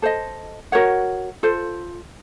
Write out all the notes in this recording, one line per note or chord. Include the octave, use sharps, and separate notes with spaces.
A4 C5 D#5
F#4 A#4 C#5 F#5
F4 A4 C5